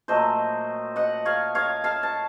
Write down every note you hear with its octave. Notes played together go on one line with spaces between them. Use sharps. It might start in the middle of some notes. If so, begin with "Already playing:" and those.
A#2 F#3 A3 C5 D#5
D#5 F#5
C#5 F5
C#5 F5
F5 A5
A5